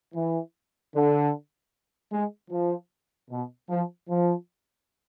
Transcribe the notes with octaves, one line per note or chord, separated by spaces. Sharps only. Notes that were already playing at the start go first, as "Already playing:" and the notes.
E3
D3
G#3
F3
B2
F3
F3